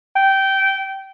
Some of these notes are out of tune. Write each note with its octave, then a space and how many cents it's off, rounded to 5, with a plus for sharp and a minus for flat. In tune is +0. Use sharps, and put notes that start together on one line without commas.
G5 -15